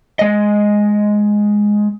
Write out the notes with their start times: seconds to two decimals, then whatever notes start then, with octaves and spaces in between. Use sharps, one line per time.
0.19 G#3 D#5